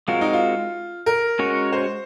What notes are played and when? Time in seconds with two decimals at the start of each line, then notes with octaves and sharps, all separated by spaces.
0.08 G#3 C4 F4 F#4 A#4
0.21 D#4
0.33 F4
1.06 A#4
1.39 G#3 C#4 F#4 C#5
1.73 C5